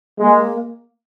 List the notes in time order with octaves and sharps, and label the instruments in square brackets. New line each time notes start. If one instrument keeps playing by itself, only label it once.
[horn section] G#3 [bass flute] A#3